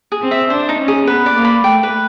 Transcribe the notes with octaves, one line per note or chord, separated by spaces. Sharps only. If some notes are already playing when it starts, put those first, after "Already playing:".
G#4
C4
E5
D4 C5
D#4
C#4
G#4
B3 B4
D5
A#3
B5
A3 G5
B4